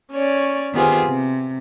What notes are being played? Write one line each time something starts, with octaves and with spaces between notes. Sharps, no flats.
C#4 C#5 D5
D#3 B3 F4 G4 G#4 C5
C3